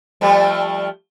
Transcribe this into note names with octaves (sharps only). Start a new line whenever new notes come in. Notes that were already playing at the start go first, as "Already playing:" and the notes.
F3 G3 A3